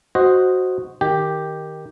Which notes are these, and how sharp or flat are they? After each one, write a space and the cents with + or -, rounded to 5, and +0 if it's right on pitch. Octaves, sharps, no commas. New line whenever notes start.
F#4 +0 C5 +0 D#5 +0
D#3 +0 G4 +0